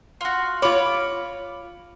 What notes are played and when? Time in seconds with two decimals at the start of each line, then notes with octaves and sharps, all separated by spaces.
0.21 F4 F#4
0.62 F4 C#5 B5 D6